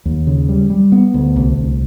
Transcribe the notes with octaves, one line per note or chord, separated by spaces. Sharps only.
D#2
C#3
G3
G3
B3
D2
C2
C2